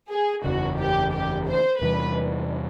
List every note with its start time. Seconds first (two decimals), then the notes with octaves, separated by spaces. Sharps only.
0.10 G#4
0.44 F#1 E2 C#3 E3 F#4
0.79 G4
1.13 G4
1.47 C5
1.81 E2 C3 E3 G3 B4